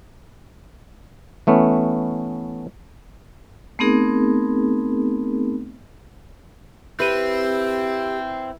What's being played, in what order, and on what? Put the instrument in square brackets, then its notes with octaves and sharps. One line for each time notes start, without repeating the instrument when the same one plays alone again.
[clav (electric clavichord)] E3 A3 B3 C#4
[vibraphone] A3 B3 C4 D#4 G#4 A#4
[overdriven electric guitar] C4 [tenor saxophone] E4 [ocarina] G4 [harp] B4 D#7